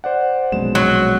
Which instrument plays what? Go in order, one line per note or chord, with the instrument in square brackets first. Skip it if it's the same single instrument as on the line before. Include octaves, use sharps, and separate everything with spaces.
[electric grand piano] C5 D5 F#5
[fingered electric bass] A#1 F#2 B2 [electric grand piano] G#3 E7
[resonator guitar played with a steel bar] F#3